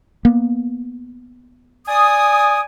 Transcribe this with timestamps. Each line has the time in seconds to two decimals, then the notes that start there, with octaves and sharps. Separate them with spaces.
0.25 A#3 B3
1.87 D5 G#5 D#6